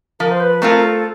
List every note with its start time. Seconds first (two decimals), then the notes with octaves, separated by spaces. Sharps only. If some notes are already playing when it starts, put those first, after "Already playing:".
0.20 F3 A#4
0.31 C5
0.40 B4
0.62 A3 C4 F4 A#4
0.83 A4